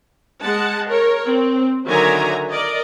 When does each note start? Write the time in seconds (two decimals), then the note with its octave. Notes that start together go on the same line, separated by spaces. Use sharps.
0.43 G#3 F#5 A5
0.90 A#4 C#5
1.26 C4
1.86 D3 D#3 F#3 E5 G#5 A#5
2.50 A#4 D5 D#5